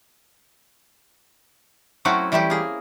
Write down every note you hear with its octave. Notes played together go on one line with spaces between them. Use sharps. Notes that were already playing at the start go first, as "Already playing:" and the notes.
F#3 A3 C4 C#4 E4 F#4
E3 G3 A3 E4 G4
A#3 G#4